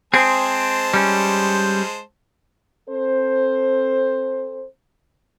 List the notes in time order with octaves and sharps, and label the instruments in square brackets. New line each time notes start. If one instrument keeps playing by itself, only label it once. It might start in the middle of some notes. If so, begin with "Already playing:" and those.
[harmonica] G#3 C5 A5 [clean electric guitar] C4 G#4
[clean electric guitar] G3 C#4
[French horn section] C4 A4 C5